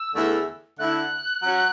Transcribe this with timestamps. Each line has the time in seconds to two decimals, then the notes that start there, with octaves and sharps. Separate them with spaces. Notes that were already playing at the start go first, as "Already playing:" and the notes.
Already playing: E6
0.15 E2 D3 A3 E4 A4
0.78 D3 A3 E4 F#6
1.42 F#3 C#4 F#4